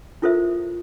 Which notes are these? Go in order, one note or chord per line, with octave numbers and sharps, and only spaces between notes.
E4 F4 A4 A#4 C5 E5